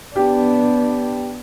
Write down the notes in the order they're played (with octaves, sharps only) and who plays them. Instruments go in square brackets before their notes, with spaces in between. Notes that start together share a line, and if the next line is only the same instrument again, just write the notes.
[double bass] B3 D4 [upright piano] G4